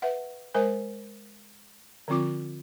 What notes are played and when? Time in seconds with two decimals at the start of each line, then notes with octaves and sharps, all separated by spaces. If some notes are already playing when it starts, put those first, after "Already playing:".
0.02 B4 E5 F#5
0.54 G#3 A#4 C5 G#5
2.08 D3 F3 C4 F4 D6